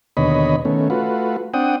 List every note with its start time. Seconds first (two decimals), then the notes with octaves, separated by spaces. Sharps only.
0.17 D#2 B2 D3 C#5 D#5 B5
0.65 D#3 A3 B3 C#4
0.90 A3 F4 F#4 B4
1.54 C4 D4 F#5 G5 D#6